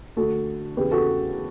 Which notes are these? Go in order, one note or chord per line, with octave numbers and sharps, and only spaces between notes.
D2 D3 F#4 A4
E2 C#3 E3 G4 B4
F#4 A4